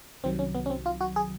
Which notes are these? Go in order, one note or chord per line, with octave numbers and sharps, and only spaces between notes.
C2 C3 D#3 F#3 C4
C#4
B3
C#4
C4
F4
F#4
G#4